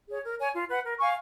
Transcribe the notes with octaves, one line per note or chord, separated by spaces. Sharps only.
G#4 C#5
A#4
C#5 G#5
F4
B4 F#5
A#4
F5 G#5 C#6